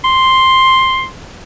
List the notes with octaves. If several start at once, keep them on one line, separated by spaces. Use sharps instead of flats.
C6